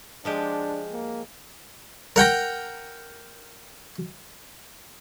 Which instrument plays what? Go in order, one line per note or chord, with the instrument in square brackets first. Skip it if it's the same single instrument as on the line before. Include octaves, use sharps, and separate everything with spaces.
[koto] F3 G#3 G4 [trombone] D4
[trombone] A#3
[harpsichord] A#4 F#5 G5 A#5